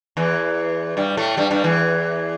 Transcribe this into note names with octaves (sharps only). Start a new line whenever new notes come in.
E2 E3
G2 G3
A2 A3
G2 G3
G2 G3
E2 E3